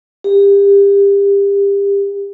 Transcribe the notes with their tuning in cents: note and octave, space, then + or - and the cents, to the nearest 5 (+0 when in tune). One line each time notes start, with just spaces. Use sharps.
G4 +30